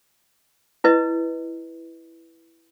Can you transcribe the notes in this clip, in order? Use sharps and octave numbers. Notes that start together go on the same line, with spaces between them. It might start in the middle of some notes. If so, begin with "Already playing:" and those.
E4 B4 D#5